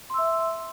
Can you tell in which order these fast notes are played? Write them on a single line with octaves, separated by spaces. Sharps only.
C6 E6 E5